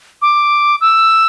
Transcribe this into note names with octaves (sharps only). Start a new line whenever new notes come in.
D6
E6